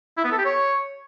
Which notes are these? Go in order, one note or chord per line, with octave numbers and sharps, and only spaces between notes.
E4
B3
A4
G4
C#5